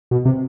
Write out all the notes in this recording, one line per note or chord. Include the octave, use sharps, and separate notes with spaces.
B2
C3